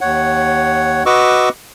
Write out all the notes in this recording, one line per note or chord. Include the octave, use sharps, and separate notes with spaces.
D#2 C#5 F#5
F#4 B4 D#5 C#6 D6 E6